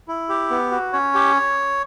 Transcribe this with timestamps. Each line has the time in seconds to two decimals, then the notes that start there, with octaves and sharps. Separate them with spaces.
0.08 E4
0.29 G4
0.51 B3
0.71 F#4
0.93 C#4 C#5
1.15 G4